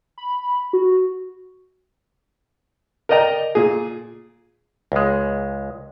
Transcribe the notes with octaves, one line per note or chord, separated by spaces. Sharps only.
B5
F#4
A#4 D5 D#5 G5 A#5
A#2 G#4
C#2 G#3